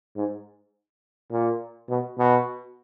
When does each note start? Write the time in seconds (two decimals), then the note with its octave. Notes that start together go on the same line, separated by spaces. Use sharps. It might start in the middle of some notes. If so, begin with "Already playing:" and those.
0.16 G#2
1.32 A#2
1.89 B2
2.19 B2